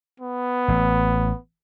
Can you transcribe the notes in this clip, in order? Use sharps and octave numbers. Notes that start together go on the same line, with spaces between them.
B3
A1